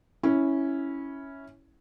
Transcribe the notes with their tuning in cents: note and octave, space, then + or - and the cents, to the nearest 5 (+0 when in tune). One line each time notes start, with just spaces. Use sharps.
C#4 +0 E4 -10